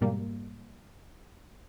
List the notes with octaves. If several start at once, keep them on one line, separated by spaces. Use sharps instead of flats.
F2 G#2 B2 G3 A#3